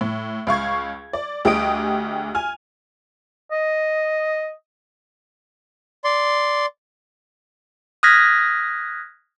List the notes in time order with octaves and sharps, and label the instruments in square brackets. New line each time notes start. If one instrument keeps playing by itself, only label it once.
[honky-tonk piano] A2
C#2 F5 C#6 G#6
D5
D2 G4 G#4 D#5 D#6 D7
G#5 F6
[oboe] D#5
[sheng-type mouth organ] D5 C6
[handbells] D#6 F6 F#6 G#6 A#6 B6